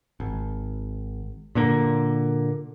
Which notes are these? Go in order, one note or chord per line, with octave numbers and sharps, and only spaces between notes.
G#1
A#2 D3 A#3